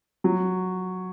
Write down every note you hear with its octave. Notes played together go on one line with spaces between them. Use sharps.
F#3